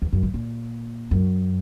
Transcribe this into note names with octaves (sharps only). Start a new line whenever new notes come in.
E2
F#2
G#2
A#2
F#2